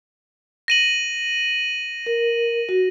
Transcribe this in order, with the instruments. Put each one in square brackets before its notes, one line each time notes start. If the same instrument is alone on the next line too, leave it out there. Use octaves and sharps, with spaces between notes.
[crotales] A#6 D#7 F#7
[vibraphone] A#4
F#4